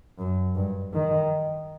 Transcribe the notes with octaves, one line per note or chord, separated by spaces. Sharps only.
F#2
G2
D#3